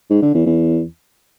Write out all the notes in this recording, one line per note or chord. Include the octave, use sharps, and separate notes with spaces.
G#2
D3
E2
E2